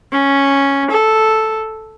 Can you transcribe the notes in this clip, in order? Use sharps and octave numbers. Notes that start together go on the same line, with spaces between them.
C#4
A4